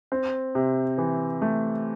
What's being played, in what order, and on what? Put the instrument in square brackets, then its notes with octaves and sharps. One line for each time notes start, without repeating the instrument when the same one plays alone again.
[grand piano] C4
C3
E3
A3